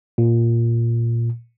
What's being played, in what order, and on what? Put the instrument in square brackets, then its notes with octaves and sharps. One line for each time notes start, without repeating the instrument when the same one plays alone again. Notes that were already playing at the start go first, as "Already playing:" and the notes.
[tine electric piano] A#2